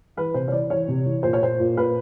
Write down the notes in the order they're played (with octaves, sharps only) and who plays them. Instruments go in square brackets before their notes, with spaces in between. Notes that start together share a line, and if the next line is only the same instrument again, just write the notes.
[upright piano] E3 B4
C3 C5
C#5
E3 D5
E3 C#5
C3
E3
A#2 C5
C#5
A#2 C5
A#2
A#2 B4